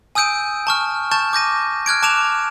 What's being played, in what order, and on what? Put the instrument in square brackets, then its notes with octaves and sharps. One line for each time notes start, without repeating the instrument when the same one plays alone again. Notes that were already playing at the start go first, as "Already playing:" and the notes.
[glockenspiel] G#5 D#6 E6 G6 D7 D#7
A5 C#6 F6
A5 C#6 G6 A6 E7
D6 G6 A#6 D#7
F6 F#6 G#6 D7
A5 D6 D7 E7 F7